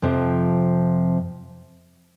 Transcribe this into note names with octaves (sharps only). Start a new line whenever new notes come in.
F2 C3 F3